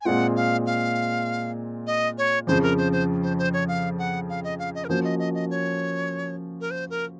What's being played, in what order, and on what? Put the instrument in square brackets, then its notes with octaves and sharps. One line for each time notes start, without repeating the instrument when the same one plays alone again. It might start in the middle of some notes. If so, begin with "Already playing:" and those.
[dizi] G#5
[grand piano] A#2 G#3 C4 F4 [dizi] F#5
[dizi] F5
F5
D#5
C#5
[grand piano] F2 C#3 F3 [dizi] C5
[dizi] A#4
C5
C5
C5
C5
C#5
F5
F#5
F5
D#5
F5
D#5
A#4
[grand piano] F3 A#3 C#4 F#4 [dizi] C5
[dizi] D#5
D#5
D#5
C#5
A#4
C5
A#4